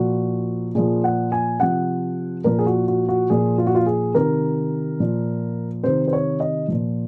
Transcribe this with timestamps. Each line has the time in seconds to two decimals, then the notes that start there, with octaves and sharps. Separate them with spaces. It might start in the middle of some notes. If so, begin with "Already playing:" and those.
Already playing: A#2 F3 F#4
0.75 A#2 F3 G#4
1.04 F#5
1.32 G#5
1.60 C3 F3 F#5
2.44 A#2 F3 A#4
2.59 G#4
2.66 F#4
2.88 F#4
3.08 F#4
3.30 A#2 F3 G#4
3.58 F4
3.67 F#4
3.75 F4
3.86 G#4
4.15 C3 D#3 A#4
5.00 A#2 F3
5.84 C3 D#3 C5
6.08 C5
6.13 C#5
6.40 D#5
6.68 A#2 F3